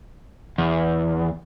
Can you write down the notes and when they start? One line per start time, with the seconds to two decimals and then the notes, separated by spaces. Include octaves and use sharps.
0.58 E2